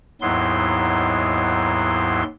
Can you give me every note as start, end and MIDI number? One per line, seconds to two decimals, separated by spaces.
0.21 2.23 39
0.21 2.23 44
0.21 2.23 54
0.21 2.23 59
0.21 2.23 64
0.21 2.23 84